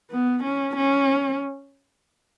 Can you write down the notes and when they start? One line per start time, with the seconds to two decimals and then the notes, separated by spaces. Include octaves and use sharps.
0.11 B3
0.43 C#4
0.76 C#4